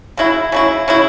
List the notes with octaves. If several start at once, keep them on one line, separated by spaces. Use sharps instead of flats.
C#3 F#3 E4
C#3 F#3 E4
C#3 F#3 E4